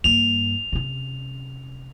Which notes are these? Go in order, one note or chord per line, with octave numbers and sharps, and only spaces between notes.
G2 A#3 F7
C3 C#4